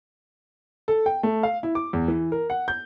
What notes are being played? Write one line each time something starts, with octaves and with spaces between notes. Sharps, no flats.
A4
G5
A3
F5
E4
D6
E2
E3
A#4
F#5
G6